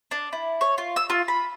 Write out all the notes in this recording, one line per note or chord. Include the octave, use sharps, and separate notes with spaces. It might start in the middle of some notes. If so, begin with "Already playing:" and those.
D4
E4
C#5
F4
E6
F4
B5